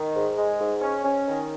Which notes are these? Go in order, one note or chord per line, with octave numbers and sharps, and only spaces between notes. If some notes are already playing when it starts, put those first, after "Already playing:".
Already playing: D#3
G#2
G#3
G#2
C#4
C#4
D#3